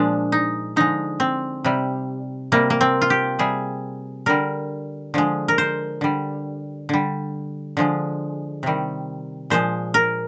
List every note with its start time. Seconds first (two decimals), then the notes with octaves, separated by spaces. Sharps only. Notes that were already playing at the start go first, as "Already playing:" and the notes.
Already playing: A#2 F3 G#3 D4
0.32 D#4
0.76 D3 F3 G#3 D#4
1.20 C4
1.64 C3 G3
2.52 C3 G3 A#3
2.70 A#3
2.81 C4
3.01 F4
3.10 G4
3.39 C3 G3 G#4
4.26 D3 G3 A#4
5.14 D3 F3 G#3
5.48 A#4
5.58 C5
6.01 D3 G3
6.89 D3 G3
7.77 D3 F3 G#3
8.63 C3 D#3 G3
9.50 A#2 F3 G#3 C5
9.94 A#4